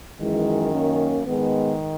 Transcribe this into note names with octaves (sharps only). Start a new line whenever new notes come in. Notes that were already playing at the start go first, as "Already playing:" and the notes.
F#2 D#3 E3 G#3
A#3 C#4
G#2 D#3 G#3 B3